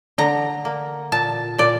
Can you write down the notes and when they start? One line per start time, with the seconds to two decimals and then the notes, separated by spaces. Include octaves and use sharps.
0.18 D3 A#5
0.65 A#3
1.12 A#2 A5
1.58 A#2 D5